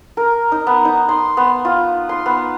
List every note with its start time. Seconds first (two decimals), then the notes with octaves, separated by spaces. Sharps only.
0.17 A#4
0.52 D#4
0.67 B3
0.85 D#4
1.09 C6
1.37 B3
1.65 F4
2.09 C6
2.26 B3